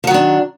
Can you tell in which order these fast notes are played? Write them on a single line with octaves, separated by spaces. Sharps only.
F3 F#3 D#3 D4